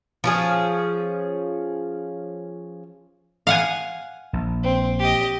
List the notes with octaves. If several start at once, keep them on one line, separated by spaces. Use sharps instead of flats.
F3 C#4 G#4
F5 F#5 G#5
A#1
C4
G4 D#5